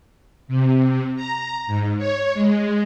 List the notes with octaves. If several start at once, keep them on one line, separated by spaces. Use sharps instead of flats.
C3
A#5
G#2
C#5
G#3